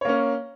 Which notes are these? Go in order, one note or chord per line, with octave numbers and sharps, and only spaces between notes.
A#3 C#4 C#5